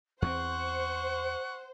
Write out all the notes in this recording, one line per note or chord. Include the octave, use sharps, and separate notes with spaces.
E2 A#3 C4 C5 F#5 C#6